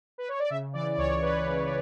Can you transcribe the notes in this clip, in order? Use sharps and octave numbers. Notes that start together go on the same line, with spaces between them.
B4
C#5
D5
C#3 E5
E3 D5
C#2 C#5
C#2 B4
C#3